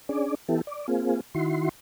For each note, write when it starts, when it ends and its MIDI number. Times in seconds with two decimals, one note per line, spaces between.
0.09 0.35 61
0.09 0.35 62
0.09 0.35 68
0.09 0.35 74
0.48 0.61 52
0.48 0.61 59
0.48 0.61 64
0.48 0.61 67
0.48 0.61 69
0.67 0.86 74
0.88 1.20 58
0.88 1.20 60
0.88 1.20 65
0.88 1.20 68
1.34 1.69 51
1.34 1.69 64
1.34 1.69 66
1.34 1.69 84